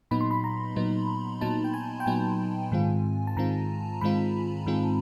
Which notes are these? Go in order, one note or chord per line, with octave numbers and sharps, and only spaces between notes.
A#2 F#3 B3 D#4 B5
C6
B5
A#5
A#2 F#3 B3 D#4
A#2 F#3 B3 D#4 A5
G5
G#5
G5
A#2 F#3 B3 D#4 G#5
G#2 D#3 G#3 C4 F4
A5
G#2 D#3 G#3 C4 F4 A#5
G#2 D#3 G#3 C4 F4 B5
G#2 D#3 G#3 C4 F4